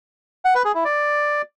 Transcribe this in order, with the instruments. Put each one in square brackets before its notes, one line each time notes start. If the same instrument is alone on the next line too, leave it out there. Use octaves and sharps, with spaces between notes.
[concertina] F#5
B4
G#4
E4
D5